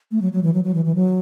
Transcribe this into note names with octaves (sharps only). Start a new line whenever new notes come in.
A3
F#3
F#3
E3
F#3
F#3
E3
E3
F#3